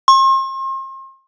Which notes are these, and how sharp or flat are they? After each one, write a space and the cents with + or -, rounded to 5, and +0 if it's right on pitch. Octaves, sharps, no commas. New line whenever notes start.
C6 +40